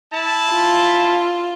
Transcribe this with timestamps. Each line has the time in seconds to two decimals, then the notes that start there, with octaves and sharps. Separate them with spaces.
0.12 E4 A5
0.54 F4